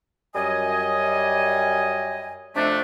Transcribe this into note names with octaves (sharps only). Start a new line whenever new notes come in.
F#2 G3 D#5 G#5
F2 C3 A3 D4